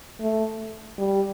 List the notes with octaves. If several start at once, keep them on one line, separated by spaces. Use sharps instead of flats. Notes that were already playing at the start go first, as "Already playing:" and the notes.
A3
G3